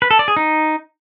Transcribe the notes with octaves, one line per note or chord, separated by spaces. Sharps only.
B4
A4
D5
G#4
D#4